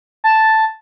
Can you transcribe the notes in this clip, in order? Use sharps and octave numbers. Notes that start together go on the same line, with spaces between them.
A5